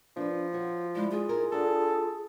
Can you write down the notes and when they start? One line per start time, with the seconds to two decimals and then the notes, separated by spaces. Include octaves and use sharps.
0.17 F3 D4 B4
0.53 F#4 C#5
0.95 G3 G#3 E4
1.11 F4 G#4
1.29 D#4 E4 A#4
1.52 D4 F#4 A4